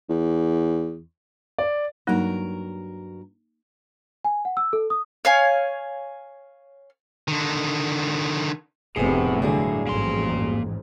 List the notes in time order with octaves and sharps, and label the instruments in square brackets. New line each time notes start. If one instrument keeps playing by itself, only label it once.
[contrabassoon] E2
[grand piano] D5
[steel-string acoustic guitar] G2 F#3 A#4 [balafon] A#3 D#4
[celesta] G#5
F#5
E6
A4
D#6
[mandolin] C#5 F5 G#5
[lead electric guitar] D3 D#3
[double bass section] F1 C3 [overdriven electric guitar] A2 [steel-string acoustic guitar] B3 G#4
[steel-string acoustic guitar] G2 F#3 G#4 [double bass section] D3
[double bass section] A1 F2 G#2 [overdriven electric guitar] A#3 C6